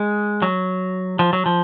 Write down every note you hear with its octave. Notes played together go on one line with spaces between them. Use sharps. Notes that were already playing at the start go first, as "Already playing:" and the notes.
Already playing: G#3
F#3
F3
F#3
F3